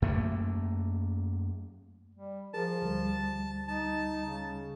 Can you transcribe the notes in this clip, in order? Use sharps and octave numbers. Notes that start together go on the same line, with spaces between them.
F#2 A3 A#3
G3
F3 G#4 A#4 A5
D2 G3
D#4 A5
C#3